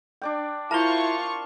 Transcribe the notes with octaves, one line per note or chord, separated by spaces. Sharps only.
D4 D5 G5
E4 F4 A#4 C5 A5 C#6 F7 G7